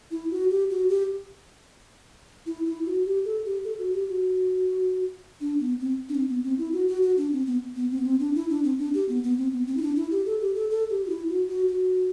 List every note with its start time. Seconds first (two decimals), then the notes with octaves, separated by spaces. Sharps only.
0.11 E4
0.31 F#4
0.50 G4
0.70 F#4
0.89 G4
2.46 E4
2.66 E4
2.86 F#4
3.06 G4
3.25 A4
3.45 G4
3.64 A4
3.79 F#4
3.94 G4
4.08 F#4
5.40 D4
5.60 B3
5.80 C4
6.09 D4
6.15 C4
6.29 B3
6.44 C4
6.58 E4
6.73 F#4
6.88 F#4
7.02 F#4
7.17 D4
7.32 C4
7.46 B3
7.76 B3
7.91 C4
7.98 B3
8.05 C4
8.20 D4
8.35 E4
8.49 D4
8.64 C4
8.79 D4
8.94 G4
9.09 B3
9.24 B3
9.38 C4
9.53 B3
9.67 C4
9.77 E4
9.82 D4
9.96 E4
10.11 G4
10.26 A4
10.41 G4
10.55 A4
10.70 A4
10.90 G4
11.04 F#4
11.09 E4
11.29 F#4
11.49 F#4
11.68 F#4